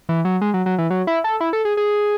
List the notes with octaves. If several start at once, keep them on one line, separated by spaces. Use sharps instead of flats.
E3
F#3
G#3
F#3
F#3
E3
F#3
E4
A4
E4
A4
G#4
G#4